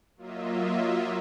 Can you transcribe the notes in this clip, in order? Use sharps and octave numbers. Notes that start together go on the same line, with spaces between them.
F#3 A#3 F4 D#5 E5